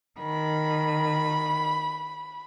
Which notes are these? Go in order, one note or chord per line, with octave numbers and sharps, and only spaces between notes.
D#3 B5